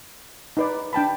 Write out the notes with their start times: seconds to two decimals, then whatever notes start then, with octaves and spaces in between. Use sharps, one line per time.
0.57 D#4 B4 D5
0.93 D4 G5 A5 B5